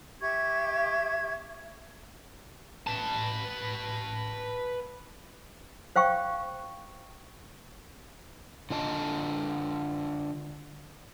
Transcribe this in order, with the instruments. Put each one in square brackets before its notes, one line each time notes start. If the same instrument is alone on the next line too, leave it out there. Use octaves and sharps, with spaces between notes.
[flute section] G4 E5 C#6 G#6
[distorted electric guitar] B4 A5
[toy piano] C5 F5 G5 C#6
[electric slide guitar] D3 F4 D#5 A5